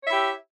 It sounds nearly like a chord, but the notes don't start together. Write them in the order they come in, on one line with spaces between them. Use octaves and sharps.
C#5 E5 E4 G4